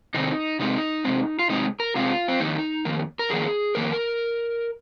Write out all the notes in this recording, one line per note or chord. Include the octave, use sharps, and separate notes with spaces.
C3 D#3 C4 D#4
C3 G#3 C4 D#4
C3 G#3 C4
F4
C3 G#3 C4 D#4
A#4
C3 G#3 C4 F4
C4
F2 D#3 A#3 D#4
F2 D#3 A#3
A#4
F2 D#3 A#3 G#4
F2 D#3 A#3 A#4